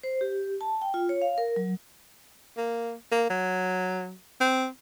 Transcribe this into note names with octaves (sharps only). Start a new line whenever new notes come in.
C5
G4
A5
G5
F4
C#5
F5
A#4
F#3
A#3
A#3
F#3
C4